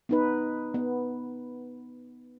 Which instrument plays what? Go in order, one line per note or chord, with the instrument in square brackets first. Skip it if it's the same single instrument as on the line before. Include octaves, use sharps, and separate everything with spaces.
[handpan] B3 D#4 B4
B3